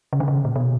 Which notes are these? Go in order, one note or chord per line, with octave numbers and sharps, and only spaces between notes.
C#3
D3
C#3
A#2
B2